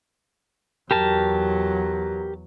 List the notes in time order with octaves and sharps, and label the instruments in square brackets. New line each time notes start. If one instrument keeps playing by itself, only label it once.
[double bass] E2 F#3 [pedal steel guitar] G4 A#4 A5